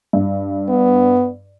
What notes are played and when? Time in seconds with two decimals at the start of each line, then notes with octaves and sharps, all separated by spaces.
0.13 G2
0.69 B3